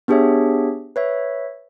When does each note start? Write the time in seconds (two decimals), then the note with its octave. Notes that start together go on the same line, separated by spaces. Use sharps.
0.08 B3 D4 G4 G#4 C#5 E5
0.96 B4 C#5 E5